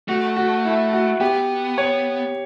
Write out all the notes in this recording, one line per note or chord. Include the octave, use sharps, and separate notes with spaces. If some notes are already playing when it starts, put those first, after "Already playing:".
A3 F#4
F#4
E4
F#4
B3 G4
C#5